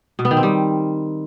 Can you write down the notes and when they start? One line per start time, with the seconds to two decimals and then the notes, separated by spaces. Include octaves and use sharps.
0.19 B2
0.25 B3
0.31 D#3
0.37 C4
0.43 G3